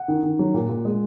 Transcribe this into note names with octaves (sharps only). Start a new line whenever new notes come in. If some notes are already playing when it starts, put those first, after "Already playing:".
Already playing: F#5
D#3
D#3
F#3
A#2
A#2
G#3